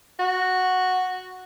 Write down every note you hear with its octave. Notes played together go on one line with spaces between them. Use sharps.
F#4